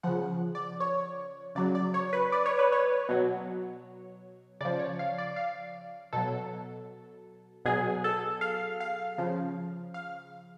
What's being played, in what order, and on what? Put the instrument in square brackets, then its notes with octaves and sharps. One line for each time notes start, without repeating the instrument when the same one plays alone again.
[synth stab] C#3 F3 F#5
D5
C#5
C#3 F#3 D5
D5
C#5
B4
D5
C#5
B4
C#5
B2 F#3
C#3 F3 D5
C#5
F5
D5
F5
B2 F#3 A4
B2 F#3 G#4
A4
F5
F5
C#3 F3
F5